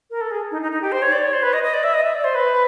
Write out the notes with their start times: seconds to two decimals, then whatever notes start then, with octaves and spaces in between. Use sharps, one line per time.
0.10 A#4
0.21 A4
0.31 G#4
0.51 D#4
0.62 D#4
0.72 D#4
0.82 G4
0.92 C5
1.02 C#5
1.12 D5
1.23 C#5
1.33 C5
1.43 B4
1.53 D#5
1.63 D#5
1.74 D5
1.83 E5
1.94 D#5
2.04 E5
2.14 D5
2.24 C5
2.35 B4